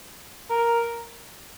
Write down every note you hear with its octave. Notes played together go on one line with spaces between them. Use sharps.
A#4